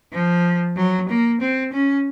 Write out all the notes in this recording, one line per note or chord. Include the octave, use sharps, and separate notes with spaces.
F3
F#3
A#3
C4
C#4